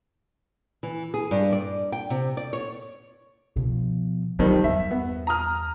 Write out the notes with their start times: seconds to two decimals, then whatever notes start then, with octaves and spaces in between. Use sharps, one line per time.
0.83 E3
1.14 G#4
1.31 G2
1.52 D5
1.92 G5
2.10 C3
2.37 D5
2.53 C#5
3.56 B2 F3
4.39 F2 D#3 F#3 G3
4.64 E2 G2 E5
4.91 B3
5.27 A#5 D#6 F6